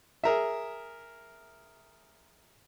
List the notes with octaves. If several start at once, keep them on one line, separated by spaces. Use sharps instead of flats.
G#4 A#4 E5